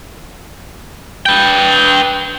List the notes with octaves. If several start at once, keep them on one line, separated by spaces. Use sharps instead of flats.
B4 G5